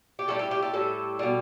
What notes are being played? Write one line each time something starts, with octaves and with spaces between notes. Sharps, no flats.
G4
A2 G3 A4
G4
G4
A4
A2 G3 A4
B2 G3